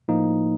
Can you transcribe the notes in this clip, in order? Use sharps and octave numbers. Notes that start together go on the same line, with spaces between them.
A2 F3 A#3 D#4